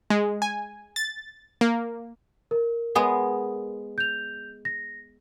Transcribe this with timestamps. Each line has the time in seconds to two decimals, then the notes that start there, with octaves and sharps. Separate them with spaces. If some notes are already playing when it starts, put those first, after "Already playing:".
0.10 G#3
0.42 G#5
0.96 A6
1.61 A#3
2.51 A#4
2.95 G#3 B3 G#4
3.98 G6 F7
4.65 A#6